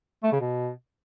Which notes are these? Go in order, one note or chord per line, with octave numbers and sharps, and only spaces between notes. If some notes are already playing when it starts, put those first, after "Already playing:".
A3
C#3
B2